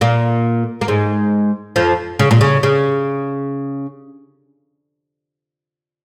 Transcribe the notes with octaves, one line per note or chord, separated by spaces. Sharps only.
A#2 A#3
A#3
G#2 G#3
F2 F3
C#3
A#2
C#3
C#3